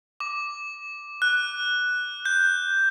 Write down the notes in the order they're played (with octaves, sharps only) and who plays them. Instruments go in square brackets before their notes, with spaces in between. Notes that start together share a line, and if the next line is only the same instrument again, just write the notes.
[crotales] D6
F#6
G6